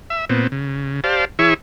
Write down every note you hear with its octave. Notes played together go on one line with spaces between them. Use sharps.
E5
A#2 B3 C4
C#3
G4 C5 D5 F5 A5
E3 E4 G#4 C#5 E5 C#6